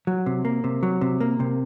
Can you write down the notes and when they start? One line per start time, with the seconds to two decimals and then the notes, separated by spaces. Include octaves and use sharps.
0.07 F#3
0.26 C3
0.45 A#3
0.64 C3
0.83 F#3
1.01 C3
1.20 A#3
1.40 C3